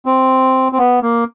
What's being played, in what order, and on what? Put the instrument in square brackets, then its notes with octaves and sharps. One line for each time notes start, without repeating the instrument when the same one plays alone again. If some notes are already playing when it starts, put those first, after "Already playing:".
[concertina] C4
C4
B3
A#3